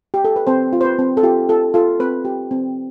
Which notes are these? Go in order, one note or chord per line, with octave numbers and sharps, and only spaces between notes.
G4
A4
B4
C4 C5
F4
C5
B4
C4
A4
F4 G4
F4 A4
F4 A4
C4 B4
G4
C4